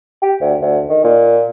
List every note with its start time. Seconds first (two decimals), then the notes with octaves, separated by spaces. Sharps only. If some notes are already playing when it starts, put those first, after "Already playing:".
0.23 G4
0.41 D2
0.62 D2
0.90 D#3
1.04 A#2